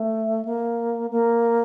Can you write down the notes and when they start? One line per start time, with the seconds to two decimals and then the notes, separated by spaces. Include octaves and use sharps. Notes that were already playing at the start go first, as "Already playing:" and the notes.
Already playing: A3
0.45 A#3
1.10 A#3